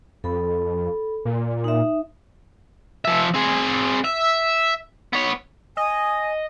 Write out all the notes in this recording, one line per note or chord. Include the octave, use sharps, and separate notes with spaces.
F2 A4 B5
A#2
D#4 E5
F3 E5
C4 G#4
E5
B3 C#5
D#5 G#5